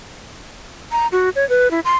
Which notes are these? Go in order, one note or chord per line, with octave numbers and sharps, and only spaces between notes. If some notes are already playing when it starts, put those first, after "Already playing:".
A#5
F#4
C#5
B4
E4
C6